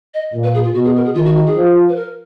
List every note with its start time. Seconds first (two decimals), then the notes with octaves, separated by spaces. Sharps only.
0.14 D#5
0.34 A#2
0.44 B4
0.54 G#4
0.64 F4
0.74 B2 F#4
0.85 G#4
0.96 A#4
1.05 G#4
1.15 D#3 F4
1.25 F#4
1.36 F#4
1.46 G#4
1.56 F3
1.89 B4
1.96 A#4